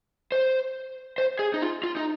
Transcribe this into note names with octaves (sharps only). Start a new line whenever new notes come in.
C5
C5
G#4
D#4
F4
F4
D#4